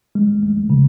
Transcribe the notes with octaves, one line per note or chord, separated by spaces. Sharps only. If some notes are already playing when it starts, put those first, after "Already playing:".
G#3
G#3
C#3